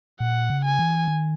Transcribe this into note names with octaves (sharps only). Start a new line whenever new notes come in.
A#2 F#5
C#3
G#5
E3
D#3